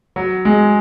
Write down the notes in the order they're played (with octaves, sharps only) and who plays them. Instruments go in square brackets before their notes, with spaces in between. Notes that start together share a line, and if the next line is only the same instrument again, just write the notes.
[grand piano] F#3
G#3